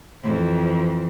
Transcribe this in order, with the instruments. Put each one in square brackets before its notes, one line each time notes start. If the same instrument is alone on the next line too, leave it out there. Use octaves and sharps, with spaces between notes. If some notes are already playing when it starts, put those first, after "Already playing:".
[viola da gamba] F2 E3